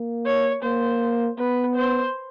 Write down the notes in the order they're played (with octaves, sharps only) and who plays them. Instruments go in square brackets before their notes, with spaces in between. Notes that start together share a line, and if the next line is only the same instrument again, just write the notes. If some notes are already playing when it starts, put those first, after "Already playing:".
Already playing: [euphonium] A#3
[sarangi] C#5
[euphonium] A#3 [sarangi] C5
[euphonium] B3 [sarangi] B4
[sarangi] C5